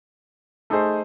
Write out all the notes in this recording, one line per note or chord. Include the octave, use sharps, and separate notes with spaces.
A3 D#4 G#4 C5